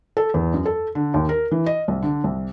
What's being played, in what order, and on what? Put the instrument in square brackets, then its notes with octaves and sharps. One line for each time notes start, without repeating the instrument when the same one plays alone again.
[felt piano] A4
E2
F#2
A4
D3
D#2
A#4
E3
D#5
C2
D3
C2